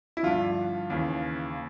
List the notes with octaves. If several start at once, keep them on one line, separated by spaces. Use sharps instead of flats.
E4
G2 D3 F3 F4
D#2 C#3 E3